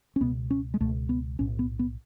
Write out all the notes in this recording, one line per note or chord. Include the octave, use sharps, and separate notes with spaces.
C#4
C#2 B2 B3
C#4
G#3
C#2 B2 A3
B3
B1 A2 C#4
B3
B3